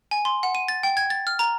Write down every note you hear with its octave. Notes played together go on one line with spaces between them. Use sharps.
G#5
C6
F#5
D#7
A6
G5
G#6
A6
F6
A#5